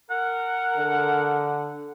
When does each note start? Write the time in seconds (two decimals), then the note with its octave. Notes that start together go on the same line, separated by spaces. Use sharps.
0.10 A#4 F#5
0.77 D3